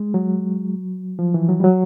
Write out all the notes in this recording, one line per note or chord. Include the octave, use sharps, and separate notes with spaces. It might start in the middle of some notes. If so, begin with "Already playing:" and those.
Already playing: G#3
F#3
F3
E3
F#3
G3
F#3